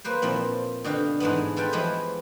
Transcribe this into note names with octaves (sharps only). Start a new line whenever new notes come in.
A#3 B4 C5
A#2 F3 C4 E4
B2 D3 G4 F5
G#2 E3 G#3 A3 B3
F4 A4 B4 G5
E3 F3 G#3 E4 G4